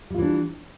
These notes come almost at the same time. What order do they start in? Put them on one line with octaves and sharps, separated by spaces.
G3 F4 E3 D4